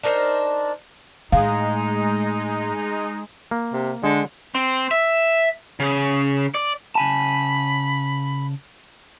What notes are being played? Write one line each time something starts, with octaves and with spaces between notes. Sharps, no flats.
D4 D#4 A#4 C5
A2 G#3 D#4 F5
A#3
C3
D3 G#3
C4
E5
C#3
D5
C#3 G#5 A5 B5